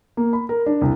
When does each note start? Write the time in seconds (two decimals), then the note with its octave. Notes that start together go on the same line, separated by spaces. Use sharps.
0.17 A#3
0.33 B5
0.49 A#4
0.66 D4
0.81 C2